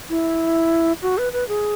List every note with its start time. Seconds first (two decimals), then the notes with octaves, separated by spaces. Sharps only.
0.09 E4
1.02 F#4
1.18 B4
1.33 B4
1.48 G#4